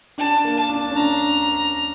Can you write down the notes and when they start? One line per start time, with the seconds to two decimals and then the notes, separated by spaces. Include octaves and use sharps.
0.18 D4 A5
0.45 A#3
0.57 A5
0.69 D4
0.90 C#4
0.95 D4 A#5